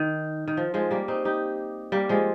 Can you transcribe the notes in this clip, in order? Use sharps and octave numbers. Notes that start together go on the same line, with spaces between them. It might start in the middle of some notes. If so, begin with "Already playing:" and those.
Already playing: D#3
D#3
F3
F3 G#3
G3 A#3
C4 D#4
D#4 G4
G3 A#3
F3 G#3